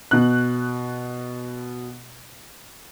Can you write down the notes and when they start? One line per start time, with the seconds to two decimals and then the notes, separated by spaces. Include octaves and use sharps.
0.11 B2 F#6